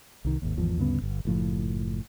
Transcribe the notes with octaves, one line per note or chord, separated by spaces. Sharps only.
C2 D#3
G#1 D#2
G#1 E2 F3
D2 G2 C#3 B3
G1
F#1 A2 F3